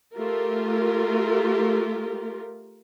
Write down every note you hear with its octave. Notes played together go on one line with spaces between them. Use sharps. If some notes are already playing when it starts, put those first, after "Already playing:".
A3 F4 G4 A#4